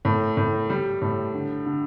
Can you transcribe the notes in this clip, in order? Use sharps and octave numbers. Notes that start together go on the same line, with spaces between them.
A2
A2
G3
A2
D3
D3